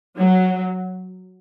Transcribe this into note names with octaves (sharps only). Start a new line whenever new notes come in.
F#3